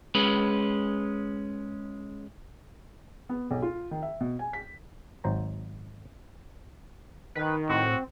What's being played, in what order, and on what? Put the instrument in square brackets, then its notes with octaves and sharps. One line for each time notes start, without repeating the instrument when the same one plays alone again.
[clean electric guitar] G#3 C#4 B4
[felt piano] B3
B1
F4
D#3
E5
B2
G#5
B6
[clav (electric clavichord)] G#1 F#3 C5 A#5
[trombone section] D#3 [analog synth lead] B4
[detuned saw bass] A2 [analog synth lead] C4 [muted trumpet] F#4